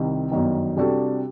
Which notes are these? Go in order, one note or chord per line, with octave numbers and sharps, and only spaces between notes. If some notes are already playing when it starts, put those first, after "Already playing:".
Already playing: C2 C3 D#3
G1 F#2 D#3
C3 G3 D4 F#4 A4